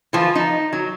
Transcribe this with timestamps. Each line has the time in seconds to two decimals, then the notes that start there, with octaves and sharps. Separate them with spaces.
0.13 E3 F3 F4
0.35 D#4
0.73 F#3